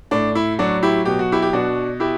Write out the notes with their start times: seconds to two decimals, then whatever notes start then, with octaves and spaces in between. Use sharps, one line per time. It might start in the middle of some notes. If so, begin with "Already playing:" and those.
0.11 A2 D4
0.35 E4
0.59 F#3 D4 F#4
0.83 E4 G4
1.05 B2 G4
1.19 F#4
1.32 E4 G4
1.42 G4
1.53 B2 D4 F#4
2.00 E4 G4